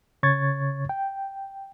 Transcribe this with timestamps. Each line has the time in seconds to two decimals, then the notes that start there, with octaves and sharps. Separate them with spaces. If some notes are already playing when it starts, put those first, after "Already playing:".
0.23 C#3 C#5 C#6 G#6 A6
0.89 G5